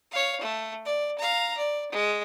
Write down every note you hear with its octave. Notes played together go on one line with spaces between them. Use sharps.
C#5 F5
A3
D5
F5 A#5
D5
G#3